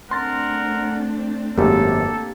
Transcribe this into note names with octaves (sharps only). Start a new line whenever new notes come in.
A3 C4 D4 A#4 F#5 C6 A6
G#1 F#2 A#3 G4 A4